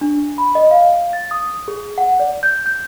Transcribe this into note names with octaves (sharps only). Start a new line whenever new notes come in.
D4
B5
D#5
F5
A6
D#6
G#4
F#5
D5
G6
G6